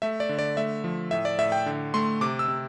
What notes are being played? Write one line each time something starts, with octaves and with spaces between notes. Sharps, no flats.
A3 E5
D5
D3
D5
A3 E5
F3
A2 E5
D5
A2 E5
G5
D3
A3 C6
C3 D6
E6
C3